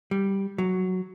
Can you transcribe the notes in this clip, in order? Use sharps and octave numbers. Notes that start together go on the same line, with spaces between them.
G3
F#3